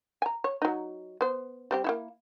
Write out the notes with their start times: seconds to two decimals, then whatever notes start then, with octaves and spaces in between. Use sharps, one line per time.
0.22 G#5 A#5
0.44 C#5
0.62 F#3 D#4
1.21 B3 C5
1.71 G3 C4 G4
1.84 A#3 D#4 E4